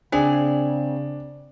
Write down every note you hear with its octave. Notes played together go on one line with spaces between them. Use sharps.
C#3 C4 D4 G#4 G#5